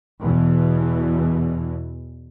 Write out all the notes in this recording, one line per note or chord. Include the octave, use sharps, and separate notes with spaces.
E2 B2 E3